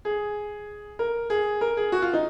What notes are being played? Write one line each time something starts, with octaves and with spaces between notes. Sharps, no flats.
G#4
A#4
G#4
A#4
G#4
F#4
F4
D#4